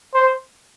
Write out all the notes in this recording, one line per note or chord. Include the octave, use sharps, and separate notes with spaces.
C5